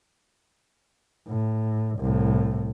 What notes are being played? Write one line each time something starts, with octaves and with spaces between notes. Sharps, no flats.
A2
C2 A2